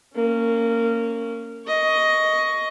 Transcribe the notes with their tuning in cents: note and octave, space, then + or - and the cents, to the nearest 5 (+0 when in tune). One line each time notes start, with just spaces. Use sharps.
A#3 -20 C#4 +0
D#5 +10 C#6 +15